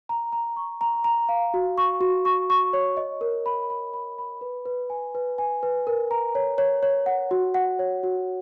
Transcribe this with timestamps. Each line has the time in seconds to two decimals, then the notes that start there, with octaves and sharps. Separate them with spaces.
0.09 A#5
0.33 A#5
0.56 C#6
0.81 A#5
1.04 A#5
1.29 F5
1.54 F#4
1.78 C#6
2.01 F#4
2.25 C#6
2.50 C#6
2.73 C#5
2.97 D#5
3.21 A#4
3.46 B5
3.70 B5
3.93 B5
4.18 B5
4.41 B4
4.66 B4
4.90 G#5
5.15 B4
5.38 G#5
5.63 B4
5.87 A#4
6.11 A#5
6.35 C#5
6.58 C#5
6.83 C#5
7.06 F#5
7.31 F#4
7.54 F#5
7.79 C#5
8.03 F#4